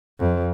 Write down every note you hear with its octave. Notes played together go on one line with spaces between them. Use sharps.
F2